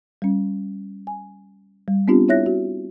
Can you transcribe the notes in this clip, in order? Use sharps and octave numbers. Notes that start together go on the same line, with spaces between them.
G3 C#4
G#5
G3
B3 C4 D4 F4 G4
E4 C#5 E5 F#6 A#6
F#4